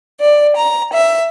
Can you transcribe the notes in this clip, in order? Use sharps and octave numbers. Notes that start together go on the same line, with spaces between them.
D5
A#5
E5